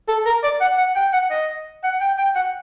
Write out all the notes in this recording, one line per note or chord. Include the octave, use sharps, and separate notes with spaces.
A4
A#4
D5
F#5
F#5
G5
F#5
D#5
F#5
G5
G5
F#5